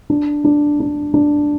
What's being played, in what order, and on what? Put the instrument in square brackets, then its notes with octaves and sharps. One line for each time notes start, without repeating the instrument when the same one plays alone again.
[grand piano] D4
D4
D4
D4